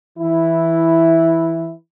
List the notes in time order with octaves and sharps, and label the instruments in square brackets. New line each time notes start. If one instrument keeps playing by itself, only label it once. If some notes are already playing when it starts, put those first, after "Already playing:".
[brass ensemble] E3 E4